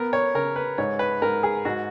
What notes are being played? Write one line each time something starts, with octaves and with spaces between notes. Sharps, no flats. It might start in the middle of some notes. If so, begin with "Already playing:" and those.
Already playing: B3 A#4
C#5
C#3 A#4
B4
G#2 C#5
B4
G#2 A#4
G#4
G#2 F#4